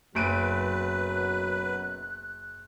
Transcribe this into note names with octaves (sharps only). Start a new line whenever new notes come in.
F#1 F#2 B2 F#3 B4 F#6 D7 D#7